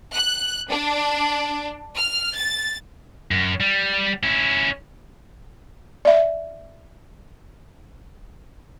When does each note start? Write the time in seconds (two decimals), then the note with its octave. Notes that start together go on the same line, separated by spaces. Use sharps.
0.14 F#6
0.71 D4
1.96 F6
2.35 A6
3.31 F#2
3.60 G3
4.23 C#4 E4
6.05 D5 E5